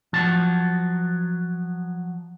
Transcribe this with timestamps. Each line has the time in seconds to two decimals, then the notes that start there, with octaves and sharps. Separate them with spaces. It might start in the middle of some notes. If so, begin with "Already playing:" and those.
0.13 F3 F#3 A5